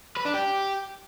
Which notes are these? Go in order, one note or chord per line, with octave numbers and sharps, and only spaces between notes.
B4
D4
G4